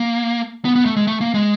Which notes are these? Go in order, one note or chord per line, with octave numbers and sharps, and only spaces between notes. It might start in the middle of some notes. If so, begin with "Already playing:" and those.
Already playing: A#3
B3
B3
A3
G#3
A3
A#3
G#3